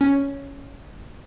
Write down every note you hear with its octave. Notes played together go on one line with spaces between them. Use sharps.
C#4